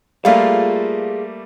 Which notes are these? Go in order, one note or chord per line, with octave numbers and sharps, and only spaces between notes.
G3 A3 A#3 F4 G#4 F5